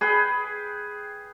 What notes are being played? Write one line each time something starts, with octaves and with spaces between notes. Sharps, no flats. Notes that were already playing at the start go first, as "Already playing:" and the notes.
G#4 B4 G5